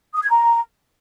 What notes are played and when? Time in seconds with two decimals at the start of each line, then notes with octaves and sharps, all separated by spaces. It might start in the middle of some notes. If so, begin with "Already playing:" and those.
0.15 D#6
0.23 G#6
0.30 A#5